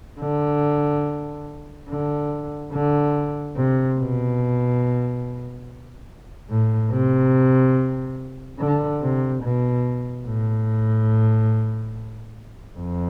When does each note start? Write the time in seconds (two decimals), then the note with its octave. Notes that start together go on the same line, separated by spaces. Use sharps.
0.21 D3
1.89 D3
2.73 D3
3.56 C3
3.98 B2
6.49 A2
6.92 C3
8.59 D3
9.02 C3
9.43 B2
10.27 A2
12.78 F2